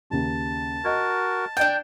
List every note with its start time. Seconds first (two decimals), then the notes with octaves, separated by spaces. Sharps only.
0.11 D#2 C#3 A5
0.85 F#4 A#4 D#5 G#6
1.57 D4 D5 G5 G6